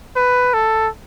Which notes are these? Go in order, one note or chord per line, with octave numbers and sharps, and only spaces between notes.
B4
A4